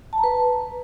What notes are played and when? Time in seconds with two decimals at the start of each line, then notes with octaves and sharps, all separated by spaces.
0.13 A5
0.18 A#5
0.24 B4